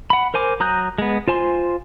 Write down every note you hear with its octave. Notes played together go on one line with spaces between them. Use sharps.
F#5 B5
A#4 C5 G#5 D6
F#3 A#5 D#6 F#6 G6
G#3 B3
F4 C5 G#5 C6